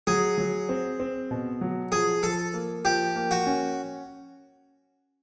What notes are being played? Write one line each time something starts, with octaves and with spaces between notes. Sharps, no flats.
F#3 G#4
F#3
C4
C4
B2
F#3
F3 G#4
F3 A4
A#3
F3 G4
A#3
F#4
C#4